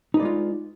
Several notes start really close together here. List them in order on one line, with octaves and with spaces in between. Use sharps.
D#4 B4 D5 G#3 F4